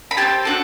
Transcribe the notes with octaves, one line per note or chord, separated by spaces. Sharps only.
B5
C4 E4 G4 A5
D4 F#4 A4